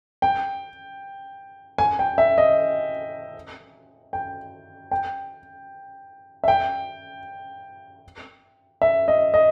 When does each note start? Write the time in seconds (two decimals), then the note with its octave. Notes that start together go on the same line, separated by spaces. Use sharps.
0.22 G5
1.78 G#5
1.99 G5
2.18 E5
2.38 D#5
4.13 G5
4.91 G5
6.44 E5
6.48 G5
8.82 E5
9.08 D#5
9.34 D#5